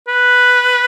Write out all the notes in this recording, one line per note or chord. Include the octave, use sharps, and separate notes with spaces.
B4